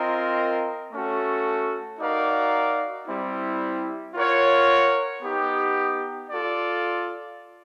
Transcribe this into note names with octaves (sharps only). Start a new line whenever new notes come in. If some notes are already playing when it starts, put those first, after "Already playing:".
Already playing: C4 F4 A#4 D#5
A3 C#4 F#4 A4
D#4 F#4 A#4 D5 F5
G3 C4 E4
F4 A#4 C#5 F#5
B3 D#4 G4
F4 A4 D5